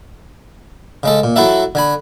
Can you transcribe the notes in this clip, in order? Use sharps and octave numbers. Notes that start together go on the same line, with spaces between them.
C#3 G#3 A4
A#2
F#3 E4 F#4 A4 E5
D3 G#5 B5